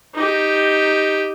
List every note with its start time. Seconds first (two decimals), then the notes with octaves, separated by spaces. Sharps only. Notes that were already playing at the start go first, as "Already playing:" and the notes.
0.15 D#4 G4